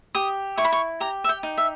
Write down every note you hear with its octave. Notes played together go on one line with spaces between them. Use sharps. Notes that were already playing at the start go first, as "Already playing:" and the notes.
G4 D#6
E4 C#6
B5
C#6
G4 A#5
E5
G5
D#4
E5